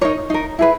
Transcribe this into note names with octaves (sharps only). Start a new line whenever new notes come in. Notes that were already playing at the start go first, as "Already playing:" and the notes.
D#4 A#4 C#5
D#4 A#4
E4 G#4 B4